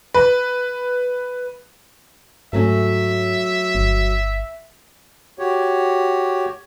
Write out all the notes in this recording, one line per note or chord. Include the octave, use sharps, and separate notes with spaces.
B4
G#2 F#3 A3 C#4 E5
G1
F#4 G4 C#5